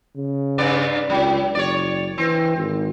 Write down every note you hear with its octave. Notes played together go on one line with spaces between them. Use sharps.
C#3
G2 B3 D5
C#2 F#3
F#1 C#5 D5
E3 C4
G#1